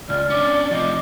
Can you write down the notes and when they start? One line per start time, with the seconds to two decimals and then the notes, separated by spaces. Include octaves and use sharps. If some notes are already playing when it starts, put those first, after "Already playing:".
0.09 C#2 D5 F6
0.30 C#4 D4 D5 D6
0.71 C3 F3 D#5